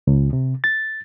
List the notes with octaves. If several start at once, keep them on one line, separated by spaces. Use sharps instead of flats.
C#2
C3
A6